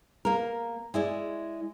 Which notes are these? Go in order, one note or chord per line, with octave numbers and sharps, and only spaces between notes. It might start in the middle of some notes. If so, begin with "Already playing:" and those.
A#3 A#4
G#3 E4 D5